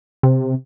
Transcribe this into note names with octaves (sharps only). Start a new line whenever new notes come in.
C3